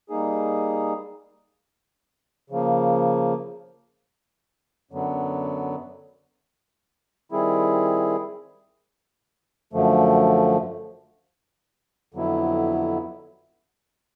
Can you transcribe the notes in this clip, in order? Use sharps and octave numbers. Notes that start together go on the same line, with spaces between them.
G3 A#3 D#4 G#4
C#3 F3 A#3
F#2 D3 F#3 B3
D#3 G3 C4 E4 G#4
F#2 D3 F3 A3
F2 D3 F#3 B3 E4